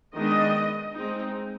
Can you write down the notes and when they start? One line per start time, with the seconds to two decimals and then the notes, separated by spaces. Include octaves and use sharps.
0.14 D#3 G#3 B3 D4 D#5
0.95 G#3 C4 D#4